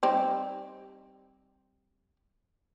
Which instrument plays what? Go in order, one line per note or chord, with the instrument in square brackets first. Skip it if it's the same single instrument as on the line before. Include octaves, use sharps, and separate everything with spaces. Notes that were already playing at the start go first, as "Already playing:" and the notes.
[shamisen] G3 C4 D#4